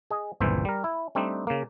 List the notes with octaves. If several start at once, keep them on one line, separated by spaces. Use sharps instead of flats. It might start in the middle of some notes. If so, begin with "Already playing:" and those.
G#4 D#5
G1 C#2 A#2 E3 C5 E5
G3 A#4
E4
G3 A3 C4 D4 D#4
C#3 A#3